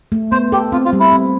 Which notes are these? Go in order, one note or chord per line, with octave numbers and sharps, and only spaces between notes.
A3
B3 C5
G4 A4
C4 F4
F4
G3
E4
C4